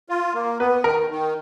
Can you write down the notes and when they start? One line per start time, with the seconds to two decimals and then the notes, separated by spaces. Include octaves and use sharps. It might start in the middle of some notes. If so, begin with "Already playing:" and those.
0.09 F4
0.34 A#3
0.60 B3 B4
0.84 D#3 A#4
1.10 D#3